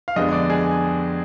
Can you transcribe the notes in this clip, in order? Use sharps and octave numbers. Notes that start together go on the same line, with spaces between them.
F5
F2 D3 G#3 B3 D#5
D5
G#4